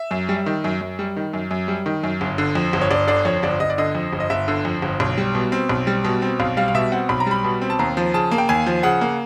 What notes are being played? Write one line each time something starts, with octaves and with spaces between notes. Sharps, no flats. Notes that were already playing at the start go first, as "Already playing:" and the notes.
Already playing: E5
F#2
G3
D#3
F#2
F#2
G3
D#3
F#2
F#2
G3
D#3
F#2
G1
D3
F2
G1
C#5
G1 D5
D3 D5
F2 C#5
G1 D5
G1 D#5
D5
D3 D#5
F2
G1
D#5
G1 E5
D3
F2
G1
B1
G3
B2
C4
B1
G3
B2
C4
B1 F5
G3 F5
F5
B2 E5
C4 F#5
B1 B5
A#5
G3 B5
B2
C4
A5
D#2 A#5
F3
C#3 A5
A#3
G5
D#2 G#5
F3
C#3 F#5
A#3